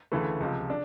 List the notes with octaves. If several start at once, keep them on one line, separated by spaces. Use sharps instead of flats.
D2 C#3 E3 A3
C#2 C3 F3
D4